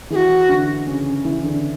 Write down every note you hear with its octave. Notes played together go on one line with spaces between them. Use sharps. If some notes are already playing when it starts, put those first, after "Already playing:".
E3 E4 G#4
F#4
D3 D4
C#3 C#4
E3 E4
D3 D4